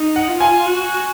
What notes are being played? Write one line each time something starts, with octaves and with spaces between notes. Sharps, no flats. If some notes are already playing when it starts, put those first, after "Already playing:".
Already playing: D#4
F#5
F4
G#5
F#4